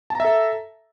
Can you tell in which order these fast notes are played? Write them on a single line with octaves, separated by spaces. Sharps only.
A5 A#5 E5 A4